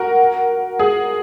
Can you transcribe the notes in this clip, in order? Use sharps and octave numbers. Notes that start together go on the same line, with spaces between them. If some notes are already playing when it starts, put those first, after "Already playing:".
Already playing: F#4 A#4
G#4